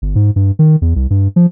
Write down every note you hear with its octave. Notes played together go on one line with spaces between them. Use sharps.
G1
G#2
G2
D#3
E2
C2
G2
F3